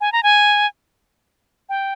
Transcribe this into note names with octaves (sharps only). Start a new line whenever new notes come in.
G#5
A#5
G#5
G5